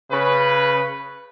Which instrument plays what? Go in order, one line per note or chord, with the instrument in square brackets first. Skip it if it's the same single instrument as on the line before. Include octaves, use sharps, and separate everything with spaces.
[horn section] C#3 B4